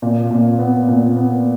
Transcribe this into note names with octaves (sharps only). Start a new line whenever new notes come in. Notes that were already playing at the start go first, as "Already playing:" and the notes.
A#2
A#2
B3
A#2
B3